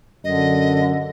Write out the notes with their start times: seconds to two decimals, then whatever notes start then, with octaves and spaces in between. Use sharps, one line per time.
0.24 F#2 D3 D#5